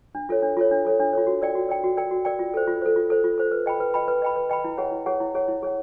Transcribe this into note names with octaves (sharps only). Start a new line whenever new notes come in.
D4
F4 A4 C#5
D4
F4 A4 C#5
D4
F4 A4 C#5
D4
F4 A4 C#5
F#4
A#4 D5 G5
F#4
A#4 D5 G5
F#4
A#4 D5 G5
F#4
A#4 D5 G5
F4
A4 C5
F4
A4 C5
F4
A4 C5
F4
A4 C5
B4
D#5 G5 B5
B4
D#5 G5 B5
B4
D#5 G5 B5
B4
D#5 G5 B5
E4
G#4 C#5 F#5
E4
G#4 C#5 F#5
E4
G#4 C#5 F#5
E4
G#4 C#5 F#5